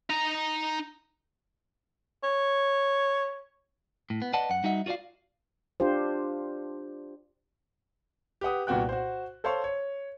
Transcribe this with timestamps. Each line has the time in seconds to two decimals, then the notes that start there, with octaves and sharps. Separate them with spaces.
0.10 D#4 A#5
2.23 C#5
4.10 A2
4.22 B3
4.33 B4 D5 D#5 F#5 A5
4.50 F#2 F#5
4.64 G3 D#4 F#4 D#5 E5 F#5
4.86 F4 F#4 C#5 D5 F5
5.80 D4 F4 G4 C5
8.41 G4 B4 F#5 D#6
8.67 C2 A#2 B3 F#4 G5 F#6
8.89 F#4 C5
9.44 A4 C5 C#5 F5 C6 C#6
9.64 C#5